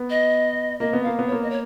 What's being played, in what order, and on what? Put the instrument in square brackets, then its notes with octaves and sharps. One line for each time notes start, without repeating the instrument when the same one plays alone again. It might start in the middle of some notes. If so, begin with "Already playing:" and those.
Already playing: [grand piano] B3
[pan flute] D#5
[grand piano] A#3 [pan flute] D#5
[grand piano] B3
[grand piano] A#3 [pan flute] F5
[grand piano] B3
[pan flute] C#5
[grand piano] A#3
[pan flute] D#5
C#5